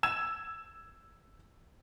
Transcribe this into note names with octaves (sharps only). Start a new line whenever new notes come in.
E6 G#6 E7